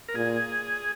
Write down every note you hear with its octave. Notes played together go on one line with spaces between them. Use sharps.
A#4
A#2 G#4